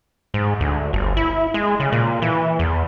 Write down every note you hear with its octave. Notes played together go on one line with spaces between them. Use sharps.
G#2
D2
G1
E4
G#3
C#3
A#2
E3
E2